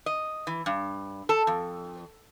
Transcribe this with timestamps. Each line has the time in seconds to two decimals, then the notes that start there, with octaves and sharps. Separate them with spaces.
0.06 D#5
0.47 E3
0.66 G2
1.29 A4
1.47 F2